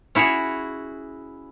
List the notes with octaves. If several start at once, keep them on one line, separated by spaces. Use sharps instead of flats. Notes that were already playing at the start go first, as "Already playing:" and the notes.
C#4 E4 F#4 G#4 C#5